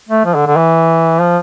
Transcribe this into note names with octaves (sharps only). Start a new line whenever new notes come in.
A3
F3
D3
D3
E3
F3